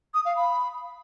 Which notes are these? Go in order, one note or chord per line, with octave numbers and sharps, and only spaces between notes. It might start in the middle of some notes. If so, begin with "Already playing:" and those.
D#6
F5
B5